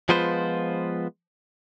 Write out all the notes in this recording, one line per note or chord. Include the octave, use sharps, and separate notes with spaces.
F3 G#3 B3 F4 B4 C5